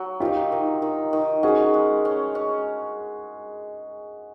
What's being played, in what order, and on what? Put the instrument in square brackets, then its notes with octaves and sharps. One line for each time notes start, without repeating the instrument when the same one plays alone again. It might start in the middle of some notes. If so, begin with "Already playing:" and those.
Already playing: [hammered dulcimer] F#3
[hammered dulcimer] D#3 [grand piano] F4 G4
[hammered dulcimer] D#3
D#3
D#3
[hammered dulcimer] C#4 [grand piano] F#4 G#4
[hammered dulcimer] G#3
C#4
C#4